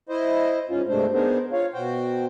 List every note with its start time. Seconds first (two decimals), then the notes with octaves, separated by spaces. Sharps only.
0.09 E4 C5 D#5
0.69 G#2 C#4 F4
0.89 G2 C3 G#3 A3 D4 C5
1.14 B3 D4 D#4 G#4 A#4 C5
1.52 F4 C#5 F5
1.74 B2 F#4 C5 G5